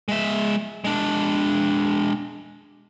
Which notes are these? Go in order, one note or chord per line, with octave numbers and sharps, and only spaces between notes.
G#3 E5
G#3 D4